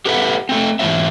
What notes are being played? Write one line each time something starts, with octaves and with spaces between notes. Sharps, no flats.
G4 A4 B4 D#5 E5 F#5
A3 C4
G#2 E3 A3 C#4 C#5 E5